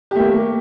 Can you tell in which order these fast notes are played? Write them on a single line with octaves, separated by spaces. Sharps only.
G4 A3 A#3